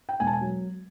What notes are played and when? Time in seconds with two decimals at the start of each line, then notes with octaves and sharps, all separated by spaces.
0.09 G5
0.20 E1 G#5
0.27 A5
0.33 G#5
0.41 F#3